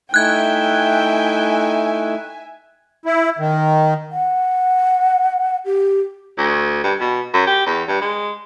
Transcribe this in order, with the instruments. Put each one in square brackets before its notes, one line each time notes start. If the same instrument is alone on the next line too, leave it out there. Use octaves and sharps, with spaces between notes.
[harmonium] A3 D#4 E4 [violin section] E5 G#5 [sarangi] G5 [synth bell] F#6 G#6
[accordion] E4
D#3
[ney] F#5
G4
[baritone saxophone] D2
G2
B2
F#2
G4
E2
G2
G#3